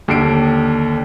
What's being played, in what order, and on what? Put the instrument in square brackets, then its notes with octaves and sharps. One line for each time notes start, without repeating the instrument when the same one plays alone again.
[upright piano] D#2 D3 C7 D7